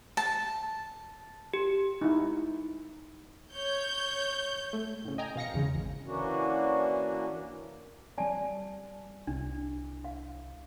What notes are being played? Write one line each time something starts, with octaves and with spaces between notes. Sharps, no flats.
A5
G4
D#4 E4
C#5 G6
A3
A2 C#3
D#5 G5 G#5 A#5
B2 F5 A#6 C#7
E2 C#3 G#3
G#1
E3 A#3 C#4 D4 F#4
G3 C4 D5 G#5 A5
C2 D4
F5